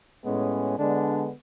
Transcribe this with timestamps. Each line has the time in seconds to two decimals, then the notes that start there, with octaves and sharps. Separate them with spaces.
0.24 A2 G#3 B3 C#4
0.77 D3 G#3 B3 D4